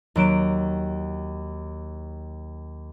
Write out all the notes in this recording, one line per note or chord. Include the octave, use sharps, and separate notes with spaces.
D#2 F#3 D7 E7